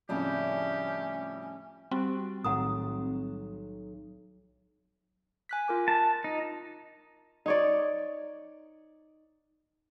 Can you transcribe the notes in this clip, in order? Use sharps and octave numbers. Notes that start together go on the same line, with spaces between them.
F2 A2 C#3 G3 C#4 D4 E4 G4
G3 C4 F#4
B1 A2 D#3 F#5 A#5 D#6
G#5 F#6 B6
F4 A#4 D6
A5
D#4
D#4 C#5 D5